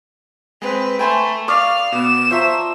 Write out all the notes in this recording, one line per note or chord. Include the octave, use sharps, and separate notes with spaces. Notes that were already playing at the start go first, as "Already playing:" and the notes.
G#3 C4 B4
A3 G5 G#5 B5 C6
D5 F5 C#6 D#6 F6
B2 B3 E7
F3 C5 E5 A#5 C#6 B6